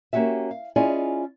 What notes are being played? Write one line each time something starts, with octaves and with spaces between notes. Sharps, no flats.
A#3 C#4 F#4 G4 E5
F5
C#4 E4 F4 G#4 D5 D#5